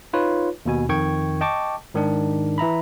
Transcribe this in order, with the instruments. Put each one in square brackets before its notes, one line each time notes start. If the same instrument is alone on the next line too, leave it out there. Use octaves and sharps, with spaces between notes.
[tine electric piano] D#4 F4 B4 C#5
D#2 B2 G#5
F2 D#3 G5 C#6 G#6
D#5 G5 A5 C#6 D6
G#2 D#3 D4
E3 E5 A#5 B5